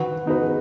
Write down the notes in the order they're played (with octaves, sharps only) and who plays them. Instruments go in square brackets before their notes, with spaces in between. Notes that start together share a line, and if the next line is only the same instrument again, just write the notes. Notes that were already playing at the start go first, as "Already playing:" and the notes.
Already playing: [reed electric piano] D#3 [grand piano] F#4 B4
[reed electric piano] B3 D#4 F#4 [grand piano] B4
[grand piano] G#4